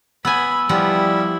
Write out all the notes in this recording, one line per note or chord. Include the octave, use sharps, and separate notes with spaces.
B3 G#5 B5 E6
F3 G3 B3 E4 F4